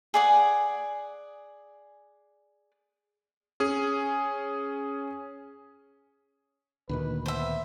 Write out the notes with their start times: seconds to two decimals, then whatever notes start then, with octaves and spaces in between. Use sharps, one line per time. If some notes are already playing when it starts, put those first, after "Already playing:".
0.14 G#4 D5 F#5
3.60 C#4 G#4
6.89 D2 A#2 D#3 B4
7.26 B3 C5 E5